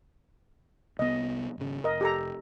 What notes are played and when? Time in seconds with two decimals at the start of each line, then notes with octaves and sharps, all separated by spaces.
0.99 C2 B3 D#5
1.58 G#1 C#3
1.84 F1 A#4 D#5
2.01 G4 A4 A#5